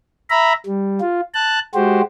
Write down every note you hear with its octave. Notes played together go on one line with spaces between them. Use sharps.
E5 A#5 B5
G3
F4
A5 F#6
G#3 F#4 G4 C5